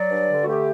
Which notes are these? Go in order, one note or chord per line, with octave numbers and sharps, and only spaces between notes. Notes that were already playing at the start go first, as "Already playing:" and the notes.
Already playing: F#3 D5
G2
D3
F#4
A3 G4